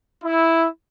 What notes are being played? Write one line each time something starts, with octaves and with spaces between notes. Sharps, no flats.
E4